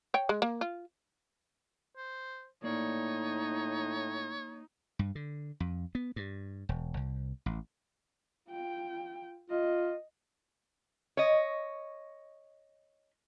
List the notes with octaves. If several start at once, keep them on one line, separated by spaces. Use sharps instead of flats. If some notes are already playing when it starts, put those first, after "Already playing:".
C#5 G5
G#3
A#3
F4
C5
A2 A#3 D#4 C#5 D5
G2
D3
F2
B3
G2
E1
C2
A1
F4 G5
F4 D#5
C#5 D#5